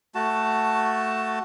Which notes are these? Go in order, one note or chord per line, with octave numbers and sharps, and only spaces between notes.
A3 F#4 A5